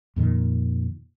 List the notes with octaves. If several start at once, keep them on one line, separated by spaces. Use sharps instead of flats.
F2 A#2 D#3